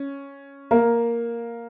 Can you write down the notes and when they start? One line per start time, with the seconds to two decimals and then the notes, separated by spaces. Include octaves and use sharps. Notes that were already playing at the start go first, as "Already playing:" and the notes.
Already playing: C#4
0.71 A#3 A#4